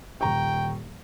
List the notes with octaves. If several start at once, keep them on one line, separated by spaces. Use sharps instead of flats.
D#1 G5 A#5 C#6